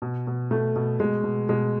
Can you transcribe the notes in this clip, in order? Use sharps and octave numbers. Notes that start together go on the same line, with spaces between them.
B2
B2
B2 A3
B2
B2 G#3
B2
B2 G#3